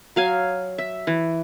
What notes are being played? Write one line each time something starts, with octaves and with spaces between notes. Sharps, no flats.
F#3 F5 G#5
E5
E3